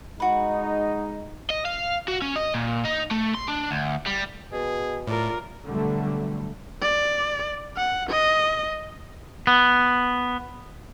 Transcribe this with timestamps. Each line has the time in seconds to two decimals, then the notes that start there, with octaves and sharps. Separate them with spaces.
0.20 G#3 D#4 F#4 B4
1.50 D#5
1.65 F5
2.08 F#4
2.22 C#4
2.36 D#5
2.54 A#2
2.85 D#4
3.11 A3
3.34 C6
3.48 D4
3.71 D2
4.06 G3
4.52 B2 G#4
5.07 A2 F4 A#4 D5
5.65 B2 D3 F#3 G3 A3
6.81 D5
7.77 F#5
8.09 D#5
9.47 B3